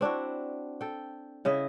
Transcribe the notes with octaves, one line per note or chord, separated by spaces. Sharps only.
C4 D4 E4 F#4
A4 G5
C#3 E4 D#5 E5